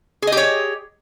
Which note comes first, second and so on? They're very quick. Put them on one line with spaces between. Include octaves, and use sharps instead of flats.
G#4 D#5 G4 C#5